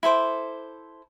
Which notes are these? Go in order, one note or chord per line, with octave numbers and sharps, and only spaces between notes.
E4 A4 C5 D6